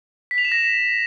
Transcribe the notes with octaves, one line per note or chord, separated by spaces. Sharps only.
B6
F7
E7
A#6